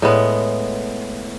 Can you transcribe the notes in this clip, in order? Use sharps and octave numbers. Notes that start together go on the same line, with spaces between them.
A2 G#3 B3